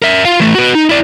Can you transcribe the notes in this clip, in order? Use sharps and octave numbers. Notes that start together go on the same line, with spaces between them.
A#4 E5
F4 F5
E3 A3
F#4 B4
D#4
E4 D5